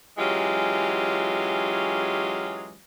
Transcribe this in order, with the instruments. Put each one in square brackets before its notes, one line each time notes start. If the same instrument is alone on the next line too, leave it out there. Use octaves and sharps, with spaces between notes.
[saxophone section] E3 F#3 G#3 C#4 F4 G4